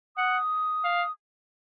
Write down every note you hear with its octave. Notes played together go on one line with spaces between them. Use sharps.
F#5 D#6
F5